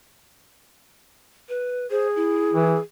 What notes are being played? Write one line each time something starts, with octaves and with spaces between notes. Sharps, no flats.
B4
G#4 C5
E4
E3